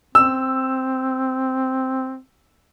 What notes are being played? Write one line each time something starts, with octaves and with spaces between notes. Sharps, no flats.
C4 E6